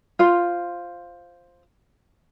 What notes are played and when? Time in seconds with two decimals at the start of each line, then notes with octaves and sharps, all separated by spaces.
0.19 F4 C5